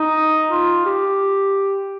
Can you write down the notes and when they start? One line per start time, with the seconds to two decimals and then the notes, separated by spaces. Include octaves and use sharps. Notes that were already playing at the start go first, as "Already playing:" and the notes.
Already playing: D#4
0.50 F4
0.85 G4